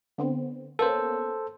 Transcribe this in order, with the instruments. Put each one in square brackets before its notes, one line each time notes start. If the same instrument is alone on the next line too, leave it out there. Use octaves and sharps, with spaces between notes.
[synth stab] D3 B3 C4
[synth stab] A#3 B3 C#4 [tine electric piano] A4 C5